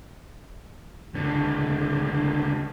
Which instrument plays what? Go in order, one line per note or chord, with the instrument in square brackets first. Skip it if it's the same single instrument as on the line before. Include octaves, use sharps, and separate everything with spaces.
[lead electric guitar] C#2 D3